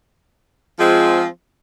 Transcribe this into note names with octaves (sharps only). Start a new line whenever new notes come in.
F3 G#3 C4 F4 G#4